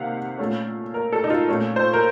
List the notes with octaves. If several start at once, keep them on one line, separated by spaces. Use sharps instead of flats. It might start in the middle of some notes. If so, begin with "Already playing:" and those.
Already playing: C3 D#3 A#3 F5 F#5
A#2 A3 C#4
A#4
A4
D#4
F4
A#2 A3 C#4
C5
A#4